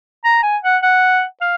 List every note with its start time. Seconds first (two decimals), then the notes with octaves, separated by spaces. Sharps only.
0.24 A#5
0.43 G#5
0.63 F#5
0.83 F#5
1.41 F5